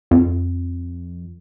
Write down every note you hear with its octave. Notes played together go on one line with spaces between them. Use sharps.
F2